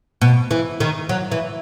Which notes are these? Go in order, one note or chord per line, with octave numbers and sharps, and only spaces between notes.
B2
E3
D#3
F#3
E3